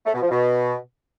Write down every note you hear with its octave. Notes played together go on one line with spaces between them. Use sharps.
A3
B2
F3
B2